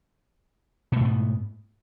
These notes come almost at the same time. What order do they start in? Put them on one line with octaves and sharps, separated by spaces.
B2 A3 G#2 B3